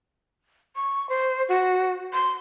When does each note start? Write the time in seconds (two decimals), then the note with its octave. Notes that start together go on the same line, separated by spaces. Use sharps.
0.76 C#6
1.09 C5
1.49 F#4
2.13 C6